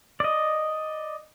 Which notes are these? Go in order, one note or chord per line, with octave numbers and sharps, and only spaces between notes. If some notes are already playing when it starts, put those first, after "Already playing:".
D5 D#5